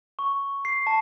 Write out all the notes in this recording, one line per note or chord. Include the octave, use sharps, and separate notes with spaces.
C#6
C7
A5